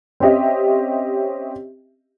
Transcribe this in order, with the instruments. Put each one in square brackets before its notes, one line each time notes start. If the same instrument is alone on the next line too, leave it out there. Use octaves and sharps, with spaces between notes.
[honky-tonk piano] C4 C#4 G4 D#5 E5